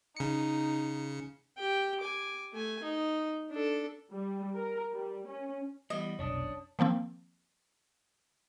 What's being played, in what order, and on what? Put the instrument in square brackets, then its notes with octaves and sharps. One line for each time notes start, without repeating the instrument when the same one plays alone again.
[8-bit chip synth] C#3 C#7 [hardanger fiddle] D#4
[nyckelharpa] G4 G5
G#5 D6
A3 G#5
D#4
D4 A4
[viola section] G3
A#4
G3
C#4
[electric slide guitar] E3 G3 B3 [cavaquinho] D#5
[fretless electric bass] F1 B1 [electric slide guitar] C#4 D4 [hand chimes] C#5 A5 D#6
[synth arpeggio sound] D#3 F3 A#3 C4